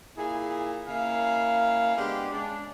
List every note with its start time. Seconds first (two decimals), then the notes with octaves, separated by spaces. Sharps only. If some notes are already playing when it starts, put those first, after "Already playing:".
0.17 A#2 E4 G#4
0.88 C#3 A#3 E4 F5
1.97 G#3 B3 D4 G4
2.32 C#3 G#3 D4